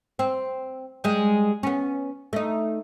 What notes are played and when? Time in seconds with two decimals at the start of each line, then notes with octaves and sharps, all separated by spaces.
0.19 C4
1.04 G3 G#3
1.63 B3 C#4
2.33 A3 D#4